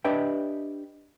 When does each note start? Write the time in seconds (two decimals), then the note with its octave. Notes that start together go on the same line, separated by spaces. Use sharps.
0.04 D4 G4 B4 D#5 E5 G5